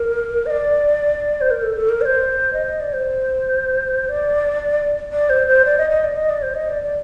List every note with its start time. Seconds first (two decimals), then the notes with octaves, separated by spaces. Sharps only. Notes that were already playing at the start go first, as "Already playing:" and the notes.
Already playing: A#4
0.46 D#5
0.50 D5
1.41 C5
1.51 A#4
1.62 A4
1.76 A4
1.89 A#4
2.01 D5
2.05 C5
2.53 D#5
2.67 D#5
2.80 D5
2.93 C5
4.09 D5
5.12 D5
5.30 C5
5.47 C5
5.65 D5
5.78 D#5
5.90 D#5
6.04 D5
6.16 D#5
6.30 D5
6.42 C5
6.55 D#5
6.68 D5
6.83 D5